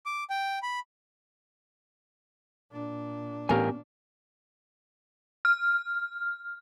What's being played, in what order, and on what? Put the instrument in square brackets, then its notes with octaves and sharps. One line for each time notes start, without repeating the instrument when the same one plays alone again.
[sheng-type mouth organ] D6
G5
B5
[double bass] A#2 D4
[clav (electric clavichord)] A1 C#5 F5 [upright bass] B3 C#4 [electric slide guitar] G4 A#4 G#5
[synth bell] F6